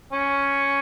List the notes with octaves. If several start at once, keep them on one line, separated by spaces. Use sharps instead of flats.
C#4